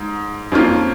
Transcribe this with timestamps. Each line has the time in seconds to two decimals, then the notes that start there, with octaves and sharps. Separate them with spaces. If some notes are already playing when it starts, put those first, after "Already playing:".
Already playing: G#2
0.52 F2 F3 A#3 C#4 F4